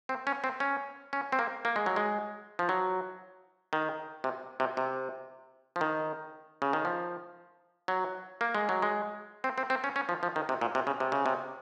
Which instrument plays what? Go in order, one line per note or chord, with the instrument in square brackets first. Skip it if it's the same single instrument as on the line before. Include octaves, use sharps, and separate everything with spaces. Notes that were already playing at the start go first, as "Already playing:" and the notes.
[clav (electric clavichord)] C4
C#4
C4
C#4
C#4
C4
A#3
A#3
G#3
F#3
G#3
F3
F#3
D#3
C3
C3
C3
F3
D#3
C#3
D#3
F3
F#3
A#3
G#3
F#3
G#3
C4
C4
C4
C#4
C#4
F3
F3
D#3
C3
A#2
C3
C#3
C3
C#3
C3